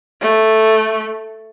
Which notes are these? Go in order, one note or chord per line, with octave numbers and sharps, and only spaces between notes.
A3